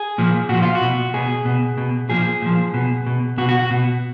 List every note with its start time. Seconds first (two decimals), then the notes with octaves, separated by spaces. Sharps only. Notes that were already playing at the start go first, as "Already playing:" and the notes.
Already playing: G#4
0.18 A#2 F3
0.49 A#2 F3 F#4
0.62 F4
0.75 F#4
0.81 B2
1.14 B2 G#4
1.45 B2
1.78 B2
2.10 A#2 F3 G#4
2.42 A#2 F3
2.74 B2
3.07 B2
3.38 B2 F#4
3.49 F#4
3.59 F#4
3.71 B2